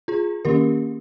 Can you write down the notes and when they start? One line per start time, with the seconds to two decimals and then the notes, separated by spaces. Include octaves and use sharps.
0.08 F4 G#4
0.45 D#3 A#3 C#4 G4 A#4